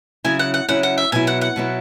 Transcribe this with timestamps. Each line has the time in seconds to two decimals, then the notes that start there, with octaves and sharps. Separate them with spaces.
0.24 C#3 F#3 C#4 E4 G#5
0.39 F#5
0.54 F#5
0.68 C#3 F#3 C#4 E4 F#5
0.83 F#5
0.98 E5
1.12 B2 F#3 B3 E4 G#5
1.27 F#5
1.41 F#5
1.56 B2 F#3 B3 E4